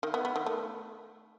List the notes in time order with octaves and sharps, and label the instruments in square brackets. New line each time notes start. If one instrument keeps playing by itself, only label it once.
[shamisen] D#3
B3
B3
D#3
A3